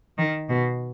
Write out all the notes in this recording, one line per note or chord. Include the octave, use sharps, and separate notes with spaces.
D#3
B2